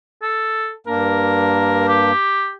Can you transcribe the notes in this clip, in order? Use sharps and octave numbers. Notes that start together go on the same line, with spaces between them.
A4
G2 A#3 D4 A#4
G4